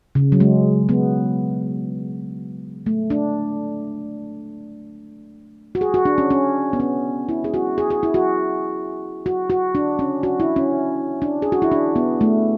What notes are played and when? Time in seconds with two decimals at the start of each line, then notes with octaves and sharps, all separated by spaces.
0.15 C#3
0.32 F#3
0.40 G#3
0.89 B3
2.86 A3
3.10 D4
5.75 F#4
5.81 G#4
5.94 F#4
6.05 D4
6.18 C#4
6.30 C#4
6.73 B3
6.80 C#4
7.29 E4
7.44 G#4
7.54 F#4
7.78 G#4
7.90 G#4
8.03 E4
8.14 F#4
9.26 F#4
9.50 F#4
9.75 D4
9.99 C#4
10.23 F#4
10.40 E4
10.56 C#4
11.22 D4
11.42 G#4
11.52 F#4
11.62 E4
11.72 D4
11.96 B3
12.21 A3